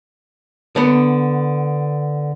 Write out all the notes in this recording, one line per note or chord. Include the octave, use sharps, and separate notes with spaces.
D3 B3